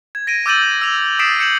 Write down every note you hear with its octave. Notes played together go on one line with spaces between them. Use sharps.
G#6
A#6 D7 D#7
D6 E6 G6 A6 D#7 F#7
E6 F7
D#6 A6 B6 C7 D7 E7
G6 C#7 E7 F#7